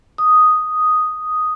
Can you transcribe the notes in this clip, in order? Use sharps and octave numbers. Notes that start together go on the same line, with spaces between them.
D#6